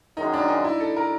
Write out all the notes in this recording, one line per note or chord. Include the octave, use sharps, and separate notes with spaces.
F#2 D#3 G#3 D#4
D4
D#4
E4
A4
A#4